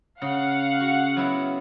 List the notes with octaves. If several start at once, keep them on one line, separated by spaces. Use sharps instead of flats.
C#3 F5 F#5
F#4
F#3 B3 E4